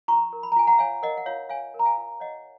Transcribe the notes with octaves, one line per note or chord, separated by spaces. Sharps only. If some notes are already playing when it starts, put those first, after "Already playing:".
F4 A#5 C#6
A#4
B5
A#5
F4 G#5
F#5 A#5
C#5 F5 G#5
A#4 D#5 F#5
F#5
F4 C#5 F5
C#5 F5 G#5
A#4
A#5
F5 G#5
F4
C#5 D#5 F#5